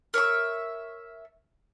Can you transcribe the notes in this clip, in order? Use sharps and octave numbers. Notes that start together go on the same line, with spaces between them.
A#4 C#5 E5 C#6